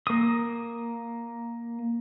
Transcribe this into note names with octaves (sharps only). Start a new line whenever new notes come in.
A#3 D#6